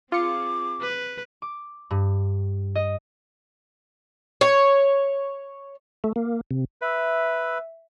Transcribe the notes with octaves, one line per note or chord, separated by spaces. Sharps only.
C4 F4 G#4 D6 C#7
B4
D6
G2
D#5
C#5
A3
A#3
C3
B4 E5